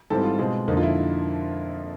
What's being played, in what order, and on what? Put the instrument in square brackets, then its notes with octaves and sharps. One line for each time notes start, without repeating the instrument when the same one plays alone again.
[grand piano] G#2 E3 G3 C4 A4
F4
B2 G#3 C4
F2 D3 F3 A#3 D#4
F4
E4